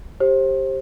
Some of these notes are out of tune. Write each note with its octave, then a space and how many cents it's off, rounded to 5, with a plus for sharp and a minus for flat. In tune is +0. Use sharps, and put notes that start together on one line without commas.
G4 +0 C5 +25